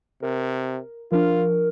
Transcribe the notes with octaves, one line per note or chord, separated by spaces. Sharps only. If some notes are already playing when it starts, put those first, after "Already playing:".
C3 A#4
F3 D4 F4 A#4